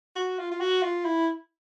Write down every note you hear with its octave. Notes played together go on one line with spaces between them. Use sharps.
F#4
F4
F4
F#4
F4
E4